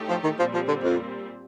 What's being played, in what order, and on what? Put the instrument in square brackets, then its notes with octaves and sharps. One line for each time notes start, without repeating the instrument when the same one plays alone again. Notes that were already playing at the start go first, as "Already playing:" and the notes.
Already playing: [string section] A2 A3 D#4 G4
[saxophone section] F3
D#3
[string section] A#2 G3 C4 [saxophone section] F3
[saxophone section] F3
D3
F2